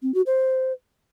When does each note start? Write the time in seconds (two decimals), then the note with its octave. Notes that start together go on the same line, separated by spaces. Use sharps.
0.02 C4
0.14 F#4
0.26 C5